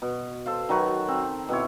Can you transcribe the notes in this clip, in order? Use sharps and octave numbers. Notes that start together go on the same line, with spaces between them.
B2
A4 C5 F5
D#3 F#3 B4 C#6
C4
B2 C4 E4 C#5